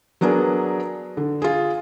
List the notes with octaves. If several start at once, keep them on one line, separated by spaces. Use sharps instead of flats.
F#3 B3 D4 G#4 A#4
D3
F4 G#4